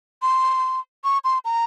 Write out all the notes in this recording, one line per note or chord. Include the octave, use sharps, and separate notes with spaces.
C6
C#6
C6
A#5